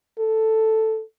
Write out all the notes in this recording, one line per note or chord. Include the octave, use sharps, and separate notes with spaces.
A4